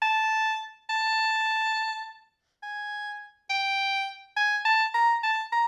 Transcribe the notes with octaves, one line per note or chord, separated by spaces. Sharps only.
A5
A5
G#5
G5
G#5
A5
A#5
A5
A#5